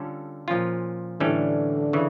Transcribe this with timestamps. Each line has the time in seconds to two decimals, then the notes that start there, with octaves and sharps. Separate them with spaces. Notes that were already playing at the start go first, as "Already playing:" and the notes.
Already playing: D3 G3 C#4 F4 A4
0.48 A#2 F3 C#4 F4
1.20 A2 D3 E3 G3 C#4
1.93 C#3 E3